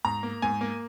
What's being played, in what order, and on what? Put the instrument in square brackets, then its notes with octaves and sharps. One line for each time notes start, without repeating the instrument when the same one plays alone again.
[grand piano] G#2 A#5
A#3
G#2 G#5
A#3